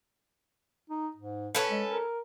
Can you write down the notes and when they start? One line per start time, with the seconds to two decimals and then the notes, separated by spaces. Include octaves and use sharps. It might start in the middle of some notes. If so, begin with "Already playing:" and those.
0.90 D#4
1.16 G#2
1.55 C#4 A4 B4
1.70 G#3
1.92 A#4